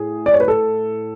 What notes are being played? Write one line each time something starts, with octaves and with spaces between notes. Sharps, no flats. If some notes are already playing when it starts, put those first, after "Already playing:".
Already playing: A2 G#4
D5
C#5
B4
A4